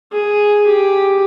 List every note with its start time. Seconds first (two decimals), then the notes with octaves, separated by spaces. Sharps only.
0.12 G#4
0.66 G4